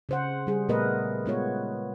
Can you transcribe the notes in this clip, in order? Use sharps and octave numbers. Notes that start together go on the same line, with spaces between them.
C#3 C5 F#5
G3 G#4
A#2 A3 B3 A#4 B4 D#5
G#3 B3 F4 C#5